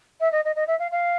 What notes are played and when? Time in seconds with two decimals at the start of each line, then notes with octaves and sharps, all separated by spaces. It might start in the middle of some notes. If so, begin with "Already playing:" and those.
0.20 E5
0.32 D#5
0.45 D#5
0.56 D#5
0.67 E5
0.79 F5
0.91 F5